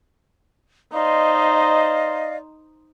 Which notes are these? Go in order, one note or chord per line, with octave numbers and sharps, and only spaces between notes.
D#4 C5 D5 D#5 F5